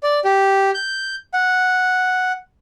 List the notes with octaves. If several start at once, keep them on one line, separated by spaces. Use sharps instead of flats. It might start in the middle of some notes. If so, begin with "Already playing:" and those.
D5
G4
G6
F#5